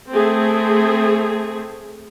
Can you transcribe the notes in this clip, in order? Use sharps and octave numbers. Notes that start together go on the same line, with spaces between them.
A3 C4 G#4